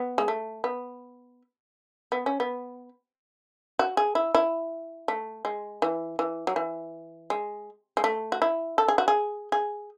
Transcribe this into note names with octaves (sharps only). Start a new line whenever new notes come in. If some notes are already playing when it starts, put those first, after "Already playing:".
Already playing: B3
G#3
A3
B3
B3
C#4
B3
F#4
G#4
E4
E4
A3
G#3
E3
E3
F#3
E3
G#3
G#3
A3
F#4
E4
A4
G#4
F#4
G#4
G#4